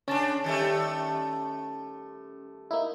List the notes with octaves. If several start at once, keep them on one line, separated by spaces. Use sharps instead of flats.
C#3 C#4 D4 A5
D#3 G3 A3
A#3 D#4 E4